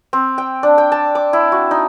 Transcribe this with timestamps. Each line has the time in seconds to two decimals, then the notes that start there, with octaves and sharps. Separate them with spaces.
0.13 C4
0.38 G5
0.63 D4
0.78 G5
0.92 A5
1.15 D6
1.33 E4
1.52 F#4
1.71 D#4